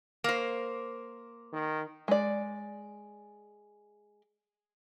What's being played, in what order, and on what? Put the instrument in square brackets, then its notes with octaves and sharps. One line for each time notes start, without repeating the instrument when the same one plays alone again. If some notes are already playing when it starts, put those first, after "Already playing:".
[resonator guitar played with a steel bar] A#3 C5
[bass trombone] D#3
[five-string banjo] G#3 D5